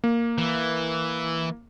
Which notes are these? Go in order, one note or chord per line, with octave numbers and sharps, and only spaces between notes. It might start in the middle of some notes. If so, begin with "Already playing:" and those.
A#3
E3